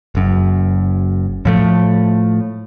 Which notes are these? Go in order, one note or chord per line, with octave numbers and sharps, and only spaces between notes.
F#1 F#2
A2 F3 A3